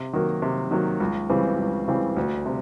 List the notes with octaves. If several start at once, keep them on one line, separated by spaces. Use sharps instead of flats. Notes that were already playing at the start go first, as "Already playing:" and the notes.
Already playing: C3
D#3 F#3 A#3
C3
D#3 F#3 A#3
C#2
C#3 E3 G3 C4
C#2
C#3 E3 G3 C4
D2
C3